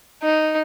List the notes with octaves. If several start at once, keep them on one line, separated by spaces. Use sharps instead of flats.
D#4